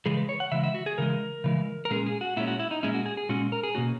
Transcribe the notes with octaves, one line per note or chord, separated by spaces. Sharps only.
C#3 E3 G#3 G#4
B4
C#5
F#5
C#3 E3 G#3 E5
E5
F#4
G#4
C#3 E3 G#3 A#4
C#3 E3 G#3
A#4
A#2 G#3 C#4 G#4
G#4
F#4
A#2 G#3 C#4 E4
F#4
E4
D#4
A#2 G#3 C#4 E4
F#4
G#4
G#4
A#2 G#3 C#4 F#4
A#4
G#4
B2 A#3 C#4 F#4